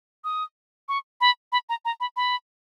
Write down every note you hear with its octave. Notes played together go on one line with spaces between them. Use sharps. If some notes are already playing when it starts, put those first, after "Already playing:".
D#6
C#6
B5
B5
A#5
A#5
B5
B5